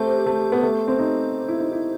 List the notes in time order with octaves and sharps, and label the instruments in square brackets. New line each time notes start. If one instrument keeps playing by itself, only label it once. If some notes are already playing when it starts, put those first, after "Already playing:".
Already playing: [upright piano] A3 C4 [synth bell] G4 C5
[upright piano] A3
B3
A3
C4
D#4
E4
D#4
E4